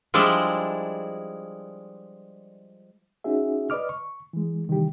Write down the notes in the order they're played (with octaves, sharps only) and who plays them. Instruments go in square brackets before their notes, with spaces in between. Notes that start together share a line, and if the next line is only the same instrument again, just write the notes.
[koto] F3 G3 G#3 D4 E4
[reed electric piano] C#4 D#4 F#4 G#4 E5
B4 D5 D#5 D6 F6
C#6
E3 G#3
C3 D#3 E3 G3 G4